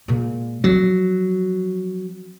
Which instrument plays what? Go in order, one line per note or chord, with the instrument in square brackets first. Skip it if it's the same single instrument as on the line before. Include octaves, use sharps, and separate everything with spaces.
[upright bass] A#2 G#3
[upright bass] F3 C4 [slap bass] F#3